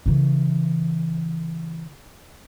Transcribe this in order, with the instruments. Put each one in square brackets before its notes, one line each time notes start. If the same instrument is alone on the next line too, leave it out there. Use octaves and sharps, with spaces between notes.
[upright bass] C#3 E3